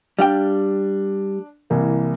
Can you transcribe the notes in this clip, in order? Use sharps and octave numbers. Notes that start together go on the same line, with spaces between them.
G3 D4 F5 G5
C2 E3 A#3